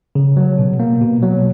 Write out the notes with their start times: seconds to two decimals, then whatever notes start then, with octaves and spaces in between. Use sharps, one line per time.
0.15 C#3
0.37 F#3
0.58 B2
0.79 A#3
1.02 B2
1.23 F#3